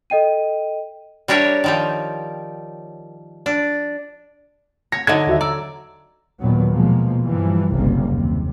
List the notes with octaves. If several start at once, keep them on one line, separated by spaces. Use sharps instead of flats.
A4 D#5 G5 D#7
G3 D4 A#4 C#5 E5
D#3 F3 G3
D4
C#5 A#6
D3 F#3 D#4 G#6
D#2 F#4 E5
D5 A#5 E6
D#2 A#2 D#3 F#3 B3
B2 F3 G#3 A#3
G2 E3 F3 G3
F#1 B1 C3 G3 A#3
D#2 C3